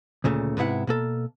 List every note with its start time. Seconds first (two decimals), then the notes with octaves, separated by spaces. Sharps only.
0.24 D2 A#2 C#3 A3
0.57 G#2 C3 B3 E4 F#5
0.87 B2 A#3 A4